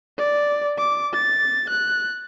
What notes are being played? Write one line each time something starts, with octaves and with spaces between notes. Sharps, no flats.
D5
D6
A6
F#6